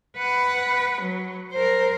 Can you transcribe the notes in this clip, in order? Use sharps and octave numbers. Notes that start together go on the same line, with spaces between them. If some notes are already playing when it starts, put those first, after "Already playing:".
B4 F#5
F#3
A#4 C5